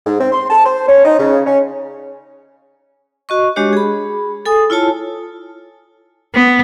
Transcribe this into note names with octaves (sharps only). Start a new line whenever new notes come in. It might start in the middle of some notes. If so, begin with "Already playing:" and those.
G#2
C4
C6
A5
C5
C#4
D#4
C#3
C#4
F#4 D#5 C#6
G#3 D4 F#4 G4 C#5
G#4 B5
A4 G#5 D#6
E4 F4 C#5 A5
B3